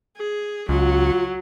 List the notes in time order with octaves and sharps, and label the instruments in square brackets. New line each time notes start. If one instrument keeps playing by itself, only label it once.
[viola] G#4
[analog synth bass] C#2 [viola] F#3 [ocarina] F4